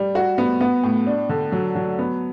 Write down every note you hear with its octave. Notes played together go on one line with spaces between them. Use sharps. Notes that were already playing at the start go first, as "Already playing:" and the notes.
Already playing: G3
F#4
B3
B3
A2
D4
D3
F#3
F#3
B3